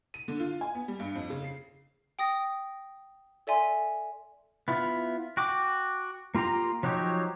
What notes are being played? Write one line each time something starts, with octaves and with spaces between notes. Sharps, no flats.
D#7
D3
F4
G#5
B3
G3
G2
F2
C#3
C7
G5 D#6 A#6
A4 D5 E5 G#5 C6
B3 E4 F4
F#4 G5 D6
A#3 F4 G4 A#5 C6
F3 F#3 D#4 G4 C#5